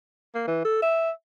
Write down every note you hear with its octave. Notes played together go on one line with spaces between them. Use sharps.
A#3
E3
A4
E5